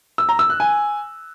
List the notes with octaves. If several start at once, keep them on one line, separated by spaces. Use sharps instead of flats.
E6
A#5
E6
F#6
G#5